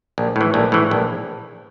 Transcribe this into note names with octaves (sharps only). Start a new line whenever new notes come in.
A#1
A2 E3
A#1
A2 E3
A#1